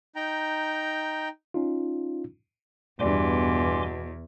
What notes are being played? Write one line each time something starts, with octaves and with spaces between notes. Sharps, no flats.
D#4 G5 A#5
C#4 D#4 F4
E2 G2 B2 D5 G#5 C6 D6